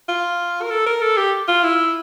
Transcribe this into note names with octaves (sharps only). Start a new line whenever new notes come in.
F4
A#4
A4
A#4
A4
G4
F4
E4